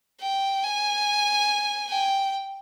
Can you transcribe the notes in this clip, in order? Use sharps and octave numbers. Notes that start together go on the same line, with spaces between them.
G5
G#5
G5